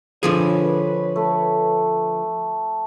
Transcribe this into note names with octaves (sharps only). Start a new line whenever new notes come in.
D3 F3 G#4 B4 C#5
A3